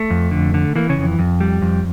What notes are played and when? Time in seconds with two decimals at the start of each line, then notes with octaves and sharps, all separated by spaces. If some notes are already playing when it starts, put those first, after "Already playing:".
Already playing: A3
0.10 F2
0.31 D3
0.54 D3
0.76 E3 A#3
0.89 C#3 C#4
0.97 F2
1.19 F2
1.41 G3
1.62 F2